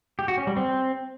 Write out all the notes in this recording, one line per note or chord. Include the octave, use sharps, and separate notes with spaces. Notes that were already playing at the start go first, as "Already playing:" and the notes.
G4
F#4
C#4
G3
C4